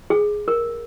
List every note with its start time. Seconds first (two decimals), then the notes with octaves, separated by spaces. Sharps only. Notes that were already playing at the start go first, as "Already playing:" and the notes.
0.10 G#4
0.48 A#4